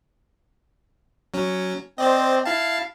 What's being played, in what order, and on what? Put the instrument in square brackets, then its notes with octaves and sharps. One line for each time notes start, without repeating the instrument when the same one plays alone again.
[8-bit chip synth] F#3 C#4
[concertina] C4 [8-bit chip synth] C5 D5 D#5
[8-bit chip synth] E4 A5 [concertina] F5